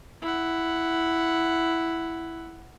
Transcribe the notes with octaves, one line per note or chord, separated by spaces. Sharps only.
E4 F#5